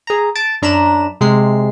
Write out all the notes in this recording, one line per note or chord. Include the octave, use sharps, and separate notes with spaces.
G#4 A#5
A5 A6 D7
F#2 D4 A#5 B5 E7
C3 G#3 C7